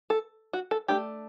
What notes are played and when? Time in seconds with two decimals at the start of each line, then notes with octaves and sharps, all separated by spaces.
0.10 A4
0.53 F#4
0.71 A4
0.88 A3 D4 G4